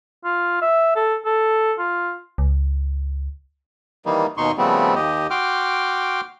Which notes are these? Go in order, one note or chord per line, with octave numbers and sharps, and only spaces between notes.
F4
E5
A4
A4
F4
C#2
D#3 E3 G3 A#3 D#4
D#2 B2 D#4 C6 C#6
C#3 F3 G3 A3 B3 C4
D#2 G4 D#5
F#4 G5 C6 D6 F6